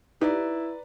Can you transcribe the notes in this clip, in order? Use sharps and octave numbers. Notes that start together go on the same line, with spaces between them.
D#4 E4 G4 B4 D5 A#5